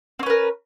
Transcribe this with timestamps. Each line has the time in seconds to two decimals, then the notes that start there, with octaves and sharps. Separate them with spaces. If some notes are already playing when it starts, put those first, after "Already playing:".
0.19 C4
0.23 C#4
0.26 B4
0.30 A#4